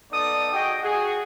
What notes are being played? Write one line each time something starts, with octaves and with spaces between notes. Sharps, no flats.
B3 D#4 A4 D5 D#6
F#4 G#4 D#5 G5
F#4 G#4